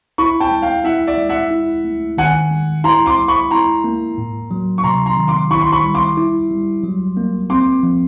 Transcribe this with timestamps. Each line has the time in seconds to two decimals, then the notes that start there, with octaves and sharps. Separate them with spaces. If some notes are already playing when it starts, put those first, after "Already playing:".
0.18 E4 B5 C#6
0.40 G5 A5
0.51 G#3
0.62 F5 G5
0.84 E4 E5 F#5
1.07 D5 E5
1.17 G#3
1.29 E5 F#5
1.51 E4
1.84 A3
2.18 D#3 F#5 G#5
2.51 G#3
2.84 E4 A#5 C6
3.06 C6 D6
3.18 G#3
3.28 B5 C#6
3.51 E4 A#5 C6
3.84 A#3
4.18 A2
4.51 F#3
4.78 C#6
4.84 C3 A#5 C6
5.06 A#5 C6
5.17 D#3
5.28 C6 D6
5.51 E4 B5 C#6
5.62 C6
5.72 B5 C#6
5.83 G3
5.95 C6 D6
6.17 E4
6.51 G3
6.84 F#3
7.17 A#3
7.50 C4 C6 D6
7.83 F3